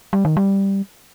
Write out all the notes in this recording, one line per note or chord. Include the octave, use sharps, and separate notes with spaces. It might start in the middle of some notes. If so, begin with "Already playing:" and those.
G3
D#3
G3